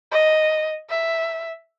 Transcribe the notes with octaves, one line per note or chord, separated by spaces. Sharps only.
D#5
E5